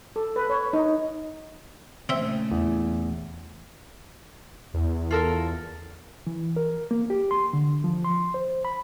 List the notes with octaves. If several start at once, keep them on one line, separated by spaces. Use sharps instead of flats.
A4
B4
C#5
D#4
A#2 C#3 A3 C4 E5
E2
E2
F4 A4 A#4
E3
A#4
A#3
G4
C6
D3
F3
C6
C5
B5